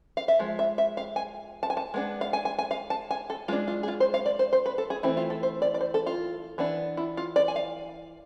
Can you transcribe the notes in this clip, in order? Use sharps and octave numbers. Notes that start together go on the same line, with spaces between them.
F5
E5
F3 G#3
E5
E5
F5
G#5
A5
G#5
A5
G#3 B3 D4
F5
G#5
G#5
G#5
F5
A5
G#5
A4
G#3 D4 F4
F4
G#4
F4
C5
F5
D5
C5
C5
B4
A4
G#4
E3 A3 C4 E4
F4
A4
C5
D5
D5
C5
A4
F4
E3 B3 D4
E4
F4
D5
G#5
F5